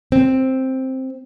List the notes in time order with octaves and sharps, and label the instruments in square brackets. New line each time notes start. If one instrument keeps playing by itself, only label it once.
[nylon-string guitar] C4